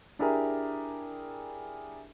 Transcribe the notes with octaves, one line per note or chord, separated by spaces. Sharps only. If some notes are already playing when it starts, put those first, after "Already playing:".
D4 E4 G4 G#4 A#4